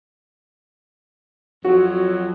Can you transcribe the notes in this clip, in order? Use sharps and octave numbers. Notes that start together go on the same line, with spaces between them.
F2 F#3 F#4